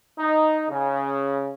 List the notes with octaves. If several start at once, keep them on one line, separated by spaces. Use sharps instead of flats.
D#4
C#3